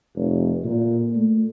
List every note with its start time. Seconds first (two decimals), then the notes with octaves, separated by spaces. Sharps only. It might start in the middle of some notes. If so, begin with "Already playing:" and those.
0.15 F1
0.64 A#2
1.15 A3